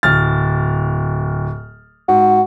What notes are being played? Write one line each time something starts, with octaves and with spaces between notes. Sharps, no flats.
D1 F6 A6
G#2 F#4